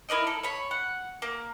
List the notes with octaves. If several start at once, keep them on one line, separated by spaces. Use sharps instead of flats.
E4 A#4 D5 D#5
A4
C#5 B5
F#5
A#3